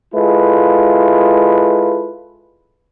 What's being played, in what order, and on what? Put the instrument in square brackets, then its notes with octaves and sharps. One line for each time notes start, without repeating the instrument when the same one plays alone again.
[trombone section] G#3 E4 F4 A4 B4